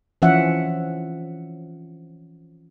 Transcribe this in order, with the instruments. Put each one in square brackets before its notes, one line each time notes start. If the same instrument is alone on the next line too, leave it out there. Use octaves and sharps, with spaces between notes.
[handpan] E3 F3 C#4 E5 F#5